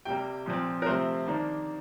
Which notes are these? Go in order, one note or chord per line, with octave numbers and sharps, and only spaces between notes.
C3 G3 A#3 G5
A#2 F3 C4
A#4
C3 F3 A3 C4 C5
D#3 A#3 D4